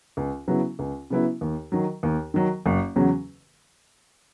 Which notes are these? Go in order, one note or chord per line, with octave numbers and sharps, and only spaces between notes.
C#2
C#3 F#3 B3 E4
C#2
C#3 F#3 B3 E4
D#2
D#3 F#3
D#2
D#3 F#3
F#1
E2 C#3 F#3 C#4